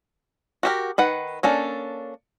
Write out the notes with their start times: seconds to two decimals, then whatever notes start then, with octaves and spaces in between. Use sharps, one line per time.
0.63 F#4 G4 A#4
0.98 D#3 B4 F#5
1.43 A#3 C#4 D4 A4